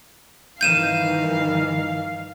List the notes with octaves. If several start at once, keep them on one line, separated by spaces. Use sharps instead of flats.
G2 D#3 E3 F5 G6 D#7 E7